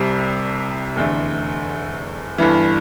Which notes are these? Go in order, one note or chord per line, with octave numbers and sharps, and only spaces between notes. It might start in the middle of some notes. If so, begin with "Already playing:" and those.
Already playing: C2 C3 G3
F1 E2 D3 A3
G1 G2 E3